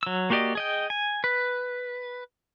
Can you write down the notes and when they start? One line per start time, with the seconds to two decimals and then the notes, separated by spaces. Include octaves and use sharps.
0.03 F#3 E6
0.30 A#3 F#4 G4 D5 D#5
0.55 G#4 D#5 G5
0.90 G#5
1.24 B4